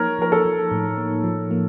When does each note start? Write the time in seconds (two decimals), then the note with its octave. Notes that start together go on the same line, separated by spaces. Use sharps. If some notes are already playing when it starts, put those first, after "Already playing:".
Already playing: F3 A#3 D#4 A#4 C#5
0.19 F3 A#4
0.32 A4
0.45 F3
0.71 A2
0.98 A#3
1.24 F3
1.51 A#3